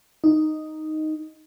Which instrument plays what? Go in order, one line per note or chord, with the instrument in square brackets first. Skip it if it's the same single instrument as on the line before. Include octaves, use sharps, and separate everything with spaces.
[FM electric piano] D#4